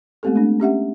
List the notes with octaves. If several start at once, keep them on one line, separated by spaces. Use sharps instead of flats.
G#3 A3 B3 C4 G4 A4
A3 D4
C#4 G4 E5 F#5